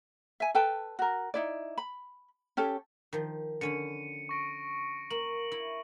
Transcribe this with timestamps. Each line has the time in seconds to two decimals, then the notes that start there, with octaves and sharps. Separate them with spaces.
0.40 E5 G#5
0.55 A4 B4 G5 A5
0.99 F#4 A#4
1.34 D#4 E4 D5
1.78 B5
2.57 C#4 G4 A4
3.13 D#3 F3
3.61 D3 C#4 B5 C#7 D#7
4.29 C#6 A#6 D7
5.10 A#3 F#7
5.52 E4